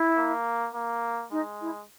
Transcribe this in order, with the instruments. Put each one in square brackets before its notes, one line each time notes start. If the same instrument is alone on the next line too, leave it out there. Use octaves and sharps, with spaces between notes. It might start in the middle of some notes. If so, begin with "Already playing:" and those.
Already playing: [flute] E4
[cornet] A#3
A#3
[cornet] G#3 [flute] D#4
[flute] E4